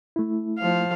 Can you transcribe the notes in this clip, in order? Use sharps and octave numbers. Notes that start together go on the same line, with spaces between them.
A3 E4
F3 F5